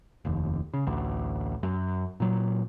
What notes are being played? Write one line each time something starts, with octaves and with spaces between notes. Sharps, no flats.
F1 D#2
C#3
A1 D2
F#2
A#2 F#3